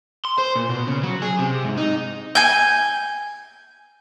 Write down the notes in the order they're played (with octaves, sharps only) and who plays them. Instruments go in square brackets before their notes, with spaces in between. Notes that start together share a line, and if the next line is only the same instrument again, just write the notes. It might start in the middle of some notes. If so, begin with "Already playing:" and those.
[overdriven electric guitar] C6
C5
A#2
B2
C#3
F#3
G#4
C3
G#2
D#4
[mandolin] G#5 G6